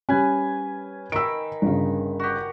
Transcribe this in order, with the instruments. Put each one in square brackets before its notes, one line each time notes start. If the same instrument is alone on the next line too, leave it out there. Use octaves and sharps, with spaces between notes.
[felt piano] G3 C#4 [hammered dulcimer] B4 G#5
[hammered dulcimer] D#3 B5 [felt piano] E6 D7
[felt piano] G1 C#3
[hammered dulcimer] F#4 G4